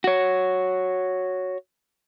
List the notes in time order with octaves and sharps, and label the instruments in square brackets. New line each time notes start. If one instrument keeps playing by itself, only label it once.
[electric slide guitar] F#4 C#5